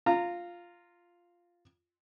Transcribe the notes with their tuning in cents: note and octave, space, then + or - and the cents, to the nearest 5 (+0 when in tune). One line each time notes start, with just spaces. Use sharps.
F4 +0 A#5 -20